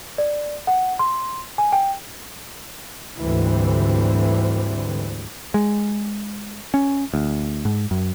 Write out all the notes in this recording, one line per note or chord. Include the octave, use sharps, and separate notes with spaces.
D5
F#5
C6
G#5
G5
D2 G#2 D3 E3 G3 C4
G#3
C#4
D2
G#2
F#2